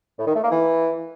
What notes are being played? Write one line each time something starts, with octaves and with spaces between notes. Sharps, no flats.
A2
D#3
A3
A#3
E3